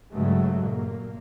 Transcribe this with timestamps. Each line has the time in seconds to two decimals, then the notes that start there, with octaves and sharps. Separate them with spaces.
0.12 G2 C#3 F#3 G#3 A3
0.61 A#2 A#3